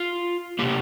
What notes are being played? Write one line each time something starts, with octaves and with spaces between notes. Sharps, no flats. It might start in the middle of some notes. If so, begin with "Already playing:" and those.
Already playing: F4
C3 D#3 A#3 G4